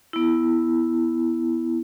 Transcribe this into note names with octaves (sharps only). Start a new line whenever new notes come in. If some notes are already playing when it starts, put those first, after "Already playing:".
B3 E4